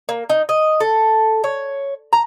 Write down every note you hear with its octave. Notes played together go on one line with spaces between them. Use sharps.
A#3
D#4
D#5
A4
C#5
A#5